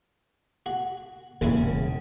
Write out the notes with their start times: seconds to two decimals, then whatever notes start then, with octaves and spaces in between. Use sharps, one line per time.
0.66 F#4
1.41 E1 A#1 C#3 E4